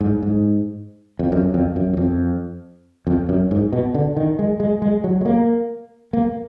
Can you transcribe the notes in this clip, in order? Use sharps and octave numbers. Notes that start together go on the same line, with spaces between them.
G#2
G#2
F2
F#2
F2
F#2
F#2
F2
F2
F#2
G#2
B2
D3
D#3
G#3
G#3
G#3
F#3
G#3
A#3
A#3